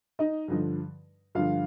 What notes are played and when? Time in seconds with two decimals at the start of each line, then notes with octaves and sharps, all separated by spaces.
0.19 D#4 D#5
0.48 G2 D3 F3
1.35 G2 D3 F3 F4 F5